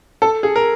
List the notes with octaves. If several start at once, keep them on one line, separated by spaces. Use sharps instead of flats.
A4
G#4
A#4